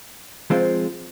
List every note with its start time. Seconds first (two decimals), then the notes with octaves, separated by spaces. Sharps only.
0.50 F3 G#3 C4 F4 C5